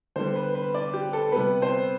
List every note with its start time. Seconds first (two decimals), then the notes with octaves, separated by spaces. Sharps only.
0.16 D3 G3 B3 C5
0.35 B4
0.55 B4
0.74 D5
0.94 G4
1.13 A4
1.32 C3 G3 B3 B4
1.62 C5